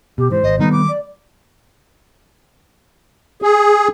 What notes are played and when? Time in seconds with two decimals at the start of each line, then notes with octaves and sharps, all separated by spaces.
0.18 B2 G4
0.31 G#2 E3 C5
0.44 G#1 D#5
0.59 D#3 G3 A3 B3 D#4
0.72 D6
0.88 D5
3.42 G#4